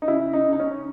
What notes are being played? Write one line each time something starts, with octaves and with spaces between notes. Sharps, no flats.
D#4
C#3 E4
D#4
C#3
D#4
C#4